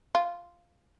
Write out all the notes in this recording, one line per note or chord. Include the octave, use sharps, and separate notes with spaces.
F4